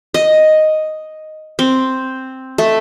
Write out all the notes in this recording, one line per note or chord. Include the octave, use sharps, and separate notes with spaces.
D#5
C4
A3